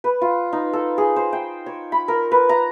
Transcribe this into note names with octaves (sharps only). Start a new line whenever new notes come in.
B4
F4
D#4
A4
G#4
C5
G5
C#5
B5
A#4
B4
A#5